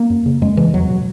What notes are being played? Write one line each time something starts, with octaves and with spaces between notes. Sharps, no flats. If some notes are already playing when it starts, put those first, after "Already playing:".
Already playing: A#3
F#2
C#3
F#2 G#3
C#3 E3
E2 F#3
B2